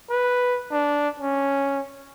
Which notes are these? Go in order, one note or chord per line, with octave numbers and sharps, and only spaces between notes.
B4
D4
C#4